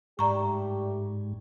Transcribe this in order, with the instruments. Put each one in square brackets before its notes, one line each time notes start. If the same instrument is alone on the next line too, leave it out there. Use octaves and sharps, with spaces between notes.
[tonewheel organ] G#2 [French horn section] G3 A3 G4 [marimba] D5 A#5 C#6